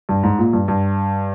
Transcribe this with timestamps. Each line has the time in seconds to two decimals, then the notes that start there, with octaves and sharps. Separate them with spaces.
0.09 G2
0.23 G#2
0.38 A#2
0.53 G2
0.68 G2